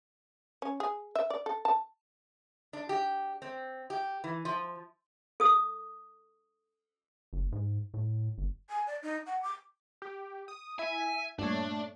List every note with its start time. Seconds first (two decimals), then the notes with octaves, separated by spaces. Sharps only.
0.62 C#4
0.80 G#4
1.15 E5
1.30 D5
1.46 A4
1.65 A5
2.73 D4
2.89 G4
3.42 C4
3.90 G4
4.24 E3
4.45 F3
5.40 A4 D#6
7.33 F#1
7.52 G#2
7.94 A2
8.38 G1
8.69 G#5
8.87 D5
9.02 D#4
9.26 F#5
9.43 D6
10.02 G4
10.48 D#6
10.79 E4 E5 G#5
11.39 G2 A#2 A3 D4 C#5